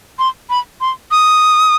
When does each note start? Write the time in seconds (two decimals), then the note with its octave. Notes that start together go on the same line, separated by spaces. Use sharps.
0.19 C6
0.50 B5
0.81 C6
1.11 D#6